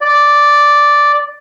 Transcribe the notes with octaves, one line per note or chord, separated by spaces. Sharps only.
D5